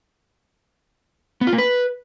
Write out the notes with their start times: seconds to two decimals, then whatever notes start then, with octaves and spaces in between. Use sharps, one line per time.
1.41 B3
1.47 F4
1.53 A#3
1.58 B4